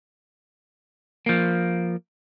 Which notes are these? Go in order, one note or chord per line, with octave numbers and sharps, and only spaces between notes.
F3 A#3